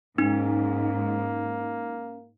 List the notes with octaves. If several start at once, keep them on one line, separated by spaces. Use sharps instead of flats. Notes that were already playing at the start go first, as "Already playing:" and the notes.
G#2 A#3 C#4 D#4